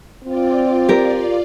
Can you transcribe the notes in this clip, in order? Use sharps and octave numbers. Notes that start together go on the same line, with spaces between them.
C4 F4 D5
G4 A#4